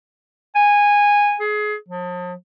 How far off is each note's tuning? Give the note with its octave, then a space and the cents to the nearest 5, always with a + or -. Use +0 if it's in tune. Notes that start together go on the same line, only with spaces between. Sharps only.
G#5 -15
G#4 +25
F3 +40